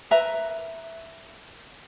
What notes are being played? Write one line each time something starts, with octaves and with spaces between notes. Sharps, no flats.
A#4 B4 E5 A#5